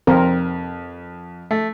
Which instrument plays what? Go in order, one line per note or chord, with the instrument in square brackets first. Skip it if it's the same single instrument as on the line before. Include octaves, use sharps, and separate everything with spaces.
[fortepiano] F2 [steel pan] C4 A#4
[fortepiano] A3